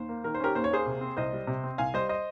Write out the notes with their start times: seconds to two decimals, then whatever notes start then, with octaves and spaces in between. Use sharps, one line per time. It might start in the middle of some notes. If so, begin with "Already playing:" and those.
Already playing: D#2 C5
0.09 A#3
0.24 D#3 A#4
0.34 C5
0.40 C#4 G4 A#4
0.55 D#2 C5
0.64 C#5
0.71 A#3 G#4 C5
0.86 C3
1.01 C4
1.17 C2 C5 D#5
1.33 G3
1.47 C3
1.64 C4
1.78 C2 F5 G#5
1.94 G3 C5 D#5
2.09 C5 D#5